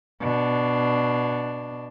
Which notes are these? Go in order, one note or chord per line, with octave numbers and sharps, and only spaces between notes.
B2 D4